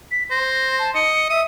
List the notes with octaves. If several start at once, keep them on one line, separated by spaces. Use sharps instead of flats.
B6
C5 A#6
A5
D#5 C#7
E5 D#6